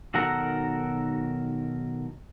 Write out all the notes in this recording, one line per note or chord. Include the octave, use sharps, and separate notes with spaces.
B1 D#3 F#4 A4 A#4 F#5